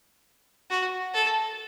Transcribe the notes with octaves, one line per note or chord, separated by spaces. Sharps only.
F#4
A4